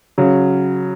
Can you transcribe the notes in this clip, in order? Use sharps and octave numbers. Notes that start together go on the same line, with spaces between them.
C#3 F#3